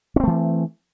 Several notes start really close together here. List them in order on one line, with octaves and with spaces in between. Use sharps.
C#4 C4 A3 E3